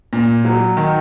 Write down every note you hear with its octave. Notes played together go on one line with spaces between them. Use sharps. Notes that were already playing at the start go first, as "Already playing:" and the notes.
A#2
F#3
D#3